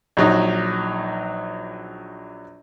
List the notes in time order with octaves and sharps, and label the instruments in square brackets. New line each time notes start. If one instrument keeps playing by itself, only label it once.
[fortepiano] A#1 F#3 D#4